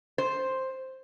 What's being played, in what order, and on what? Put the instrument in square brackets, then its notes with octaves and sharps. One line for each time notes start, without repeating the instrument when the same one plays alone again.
[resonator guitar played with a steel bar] C5